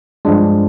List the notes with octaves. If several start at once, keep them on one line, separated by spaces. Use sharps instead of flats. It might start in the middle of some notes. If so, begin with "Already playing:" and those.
G2 F3 G#3 D4